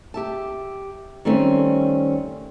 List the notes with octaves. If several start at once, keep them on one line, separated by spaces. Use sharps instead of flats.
G4 E5 A5
D#3 G3 A3 C4 C#4